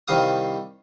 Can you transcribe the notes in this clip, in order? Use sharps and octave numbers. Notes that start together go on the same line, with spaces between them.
C2 C3 D#3 G3 F5 D#6